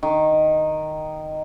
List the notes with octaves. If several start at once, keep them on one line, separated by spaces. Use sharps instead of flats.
D#3